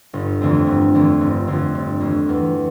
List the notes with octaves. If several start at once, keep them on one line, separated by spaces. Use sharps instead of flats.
G1
F2 D3 A3 C4
G1
F2 D3 A3 C4
G1
F2 D3 A3 C4
G1
F2 D3 A3 C4
E2